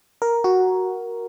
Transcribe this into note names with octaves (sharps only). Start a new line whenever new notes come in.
A#4
F#4